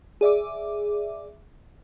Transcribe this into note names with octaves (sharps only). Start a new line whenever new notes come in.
G#4 D5 E5 D6